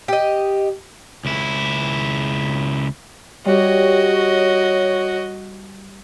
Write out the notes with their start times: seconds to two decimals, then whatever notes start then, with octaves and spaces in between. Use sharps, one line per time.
0.08 G4 D#5
1.25 C#2 E4
3.45 G3 F#4 G4 C#5 D#5